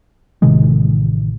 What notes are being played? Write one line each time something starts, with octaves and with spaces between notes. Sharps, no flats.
A1 C3 D#3 G#3